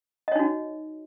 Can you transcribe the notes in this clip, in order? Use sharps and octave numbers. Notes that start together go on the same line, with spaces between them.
D#4 F#4 C#5 D#5